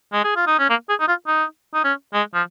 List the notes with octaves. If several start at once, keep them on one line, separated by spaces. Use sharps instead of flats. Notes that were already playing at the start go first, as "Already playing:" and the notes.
G#3
G#4
F4
D#4
C#4
A#3
G#4
D#4
F4
D#4
D#4
C#4
G#3
F3